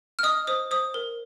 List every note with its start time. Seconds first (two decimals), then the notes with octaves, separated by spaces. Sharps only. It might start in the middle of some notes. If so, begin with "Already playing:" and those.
0.19 F6
0.23 D#5 D#6
0.47 C5 D#6
0.71 C5 D#6
0.94 A#4